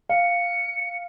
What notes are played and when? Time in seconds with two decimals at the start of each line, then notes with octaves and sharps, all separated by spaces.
0.09 F5 C#7